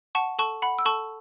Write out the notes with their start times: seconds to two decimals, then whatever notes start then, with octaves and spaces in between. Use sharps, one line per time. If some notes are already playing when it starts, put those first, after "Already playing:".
0.15 F#5 A5 C#6
0.39 A4 A5 C#6
0.62 F#5 B5
0.79 E6
0.86 A4 A5 C#6